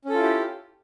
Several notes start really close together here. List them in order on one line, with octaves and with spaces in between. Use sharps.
C#4 A4 F4 E4 G4